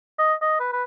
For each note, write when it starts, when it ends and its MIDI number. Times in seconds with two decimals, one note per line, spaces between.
0.19 0.34 75
0.41 0.59 75
0.60 0.70 71
0.73 0.83 71